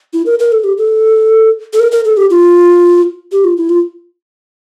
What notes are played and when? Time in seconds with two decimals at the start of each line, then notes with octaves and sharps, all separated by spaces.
0.13 E4
0.26 A#4
0.40 A#4
0.52 A4
0.64 G4
0.78 A4
1.73 A4
1.79 A#4
1.92 A#4
2.05 A4
2.17 G4
2.30 F4
3.32 G4
3.44 F4
3.57 E4
3.69 F4